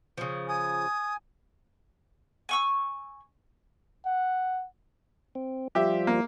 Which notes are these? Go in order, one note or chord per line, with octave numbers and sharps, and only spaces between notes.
C#3 F3
G#5 D#6
G#5 C#6 E6
F#5
C4
F3 G3 F4 G4 E5
A#3